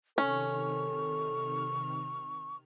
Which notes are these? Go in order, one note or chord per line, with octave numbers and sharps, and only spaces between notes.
C3 D#3 C#4 A4 C#6 F6